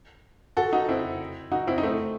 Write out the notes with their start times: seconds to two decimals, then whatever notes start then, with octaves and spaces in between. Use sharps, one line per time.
0.57 F#4 A4
0.73 D#4 F#4
0.89 C4 E4
1.52 D#4 F#4
1.67 C4 E4
1.78 D#4
1.83 A3 C4